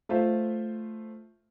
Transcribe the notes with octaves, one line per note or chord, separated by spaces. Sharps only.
A3 F4 C5 E5